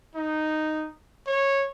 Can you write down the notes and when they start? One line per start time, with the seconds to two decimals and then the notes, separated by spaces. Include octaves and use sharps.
0.15 D#4
1.27 C#5